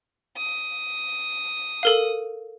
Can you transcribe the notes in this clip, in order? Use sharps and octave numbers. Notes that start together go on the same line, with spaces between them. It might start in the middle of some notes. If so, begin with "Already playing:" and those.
D#6
A4 A#4 F5